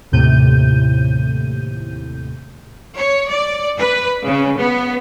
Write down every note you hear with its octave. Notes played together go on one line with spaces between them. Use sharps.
D#2 A2 C3 G6 D#7
C#5
D5
B4
C#3
B3